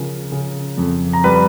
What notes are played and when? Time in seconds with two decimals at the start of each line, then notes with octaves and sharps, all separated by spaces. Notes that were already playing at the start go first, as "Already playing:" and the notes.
Already playing: C#3 F3 A#4
0.32 C#3
0.78 F2
1.13 A#5
1.24 G3 B4 B5